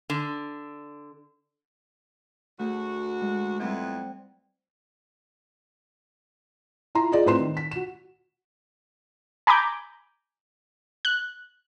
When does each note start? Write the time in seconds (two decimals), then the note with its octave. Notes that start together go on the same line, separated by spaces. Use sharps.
0.10 D3
2.59 D2 A3 F#4 G#4
3.21 G#3
3.59 F2 G3 B3 C4 E4 C5
6.95 E4 F4 A#5 C6
7.12 F4 G#4 D5 D#5
7.26 A2 C4 B4 C6 E7
7.40 D#3
7.57 B6
7.71 F#4 E7
9.47 G#5 A#5 B5 D6 G6
11.05 F#6